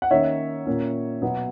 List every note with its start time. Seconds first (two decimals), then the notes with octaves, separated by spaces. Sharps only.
0.02 F#5
0.11 D#3 A#3 C#4 C#5 E5
0.66 A#2 A#3 C#4
1.22 B2 F#3 B3